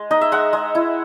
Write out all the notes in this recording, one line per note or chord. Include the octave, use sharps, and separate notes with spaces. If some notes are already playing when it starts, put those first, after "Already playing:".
Already playing: G#3
D#4 D#5
E5
G#3 F#5
G#3
E4